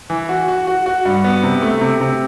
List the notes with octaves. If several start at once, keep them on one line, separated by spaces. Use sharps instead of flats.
E3
F#4
F#4
F#4
F#4
G2
B3
C3
A3
C3
C3